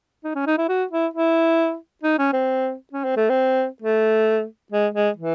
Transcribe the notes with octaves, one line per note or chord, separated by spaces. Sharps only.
D#4
C#4
D#4
E4
F#4
E4
E4
D#4
C#4
C4
C#4
C4
A3
C4
A3
G#3
G#3
E3